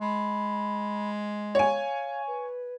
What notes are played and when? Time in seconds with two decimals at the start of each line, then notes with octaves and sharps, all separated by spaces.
0.01 G#3 B5
1.55 C#5 F5 G#5
2.27 B4